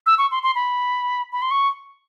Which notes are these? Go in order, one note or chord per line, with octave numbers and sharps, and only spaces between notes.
E6
C#6
C6
C6
B5
B5
C6
C#6